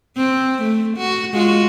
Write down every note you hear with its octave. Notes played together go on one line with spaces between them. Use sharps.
C4
A3
F#4
G#3 F4 F#4